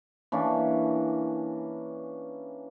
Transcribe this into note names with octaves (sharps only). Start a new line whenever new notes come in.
E3 A#3 C#4 D4